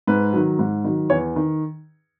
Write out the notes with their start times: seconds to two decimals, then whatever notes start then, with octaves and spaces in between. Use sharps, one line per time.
0.07 G#2 B4
0.33 D#3 F#3
0.59 G#2
0.84 D#3 F#3
1.10 E2 C#5
1.36 D#3